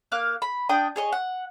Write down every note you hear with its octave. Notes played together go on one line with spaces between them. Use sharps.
A#3 F5 F#6
B5
D4 G5 D#6
G#4 C#5 D#5
F#5